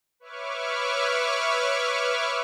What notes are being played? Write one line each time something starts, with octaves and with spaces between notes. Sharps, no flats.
B4 C#5 E5 C#6 D6 F6